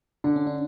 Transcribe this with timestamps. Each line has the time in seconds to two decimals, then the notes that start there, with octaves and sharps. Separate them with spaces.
0.24 D3 D4
0.36 C#4
0.47 D4